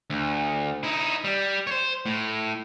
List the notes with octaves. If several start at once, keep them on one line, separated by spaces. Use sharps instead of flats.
D2
D#4 E4
G3
C5 C#5
A2